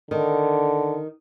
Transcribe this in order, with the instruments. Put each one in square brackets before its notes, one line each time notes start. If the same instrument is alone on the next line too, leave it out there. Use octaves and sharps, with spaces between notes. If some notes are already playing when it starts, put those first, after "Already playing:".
[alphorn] D3 [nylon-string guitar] D#3